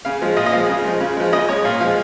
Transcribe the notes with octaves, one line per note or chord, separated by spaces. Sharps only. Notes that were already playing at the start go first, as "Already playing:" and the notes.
C#3 F5
F3 G#3
A#2 D#5
D#5
F3 G#3 F5
C#3
F3 G#3
C#3
F3 G#3
C#3 D#5
G#3 C#5
A#2 F5
F3 G#3 F5